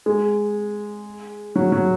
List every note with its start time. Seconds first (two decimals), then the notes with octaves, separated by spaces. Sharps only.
0.06 G#3
1.56 F#3
1.72 F#3